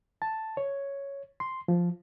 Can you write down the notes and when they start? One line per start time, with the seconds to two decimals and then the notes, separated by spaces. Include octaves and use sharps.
0.22 A5
0.57 C#5
1.40 C6
1.68 F3